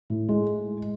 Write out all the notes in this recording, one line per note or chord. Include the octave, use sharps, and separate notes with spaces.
A2
G#3